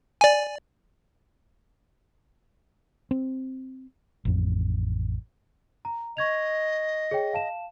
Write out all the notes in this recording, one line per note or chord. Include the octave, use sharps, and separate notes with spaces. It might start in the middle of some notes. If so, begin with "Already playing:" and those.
D5 G#5
C4
A1 F2
A#5
D#5 C#6 G#6 F7
G#4 C#5 G5
F5 A5 E7